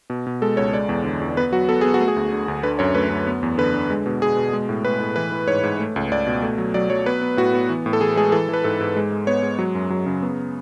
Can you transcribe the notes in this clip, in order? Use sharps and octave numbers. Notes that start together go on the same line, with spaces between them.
B2
B2
G#3 A4
C#2 C#5
G#3 D5
E2
D3
E2
B3 B4
F#3 F#4
B3 A4
B3 G#4
F#4
A3
G#4
D2
D3
D2
D3 B4
F#2 C#5
A3 B4
F#2
B3
E2
D3 B4
D3
G#3
B2
B3 G#4
B2
G#3
A2
A2 B4
A2
E3 B4
E3
G#2 C#5
G#2
A3
C#2
C#2 D5
B2
A3
F#3
F#3 D5
F#3 C#5
B3 B4
B3
A2 F#4
B3
E3
A2
A4
E3 G#4
G#3 G#4
E3 A4
E3 B4
G#2 A4
G#2
G#3
G#3
B3 C#5
G#3
F#3
F#2
F#3
C#3
B3